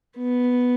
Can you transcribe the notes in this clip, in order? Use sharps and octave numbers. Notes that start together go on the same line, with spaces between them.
B3